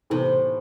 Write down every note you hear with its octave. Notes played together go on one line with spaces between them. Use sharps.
A2 C3 E3 B3